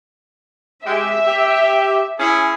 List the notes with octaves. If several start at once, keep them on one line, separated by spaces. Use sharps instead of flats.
G#3 G4 E5
G4
C#4 E4 G#4